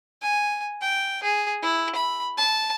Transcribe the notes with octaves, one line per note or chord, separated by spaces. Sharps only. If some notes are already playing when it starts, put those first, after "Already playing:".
G#5
G5
G#4
E4
B5
A5